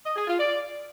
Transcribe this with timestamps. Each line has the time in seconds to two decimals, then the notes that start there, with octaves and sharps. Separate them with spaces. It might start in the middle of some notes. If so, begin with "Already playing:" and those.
0.05 D#5
0.16 G#4
0.27 F4
0.38 D5